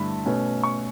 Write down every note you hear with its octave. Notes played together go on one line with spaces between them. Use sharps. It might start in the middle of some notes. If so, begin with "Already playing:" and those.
Already playing: G2 D3 A3 E4 A5 B5
B2 A3 C#4
C#6